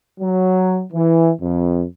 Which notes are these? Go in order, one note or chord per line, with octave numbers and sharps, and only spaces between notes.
F#3
E3
F2